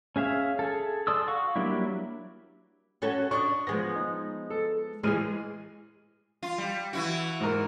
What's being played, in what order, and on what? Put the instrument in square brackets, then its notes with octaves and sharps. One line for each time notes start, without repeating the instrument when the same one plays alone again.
[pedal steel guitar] C#4 G#4 E5 F5
G#4 A4
A4 D5 C6 D#6 E6
F#4 F5 C#6
F#3 G3 A#3 D4 E4
[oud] C#4 F#4 A4
[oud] D4 D5 D#5 [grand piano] C#6
[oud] F3 G#3 B3 [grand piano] A#6
[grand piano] D#4
A4
[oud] E3 F3 G#4 [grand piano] G#3 F6 D#7
[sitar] F4
G3
E3 E4 F#4
[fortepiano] G#2 A#4